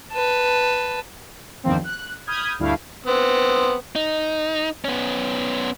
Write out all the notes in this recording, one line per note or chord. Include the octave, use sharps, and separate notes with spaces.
B4 A5
E2 G2 D#3 F3 A#3 C4
F#6
B5 D#6 F6 G6 G#6
D2 G2 G3 A3 E4 F5
B3 C4
D#4
B3 C#4